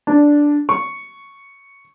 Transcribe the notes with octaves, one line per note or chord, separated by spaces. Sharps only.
D4
C#6